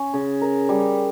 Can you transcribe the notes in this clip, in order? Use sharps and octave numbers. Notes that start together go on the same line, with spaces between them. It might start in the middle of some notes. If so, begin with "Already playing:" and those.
Already playing: C#4
C#3
A#4
G3